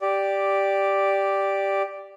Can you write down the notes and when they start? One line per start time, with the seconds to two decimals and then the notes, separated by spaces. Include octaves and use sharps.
0.01 G4 D5